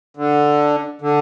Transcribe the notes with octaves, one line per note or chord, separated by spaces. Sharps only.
D3
D3